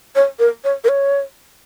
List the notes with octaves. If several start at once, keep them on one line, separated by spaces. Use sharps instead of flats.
C#5
A#4
C#5
A#4
C#5